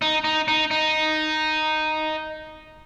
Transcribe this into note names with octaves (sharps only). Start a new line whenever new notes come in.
D#4
D#4
D#4
D#4